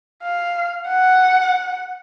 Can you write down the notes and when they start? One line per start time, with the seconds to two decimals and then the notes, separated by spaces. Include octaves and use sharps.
0.23 F5
0.87 F#5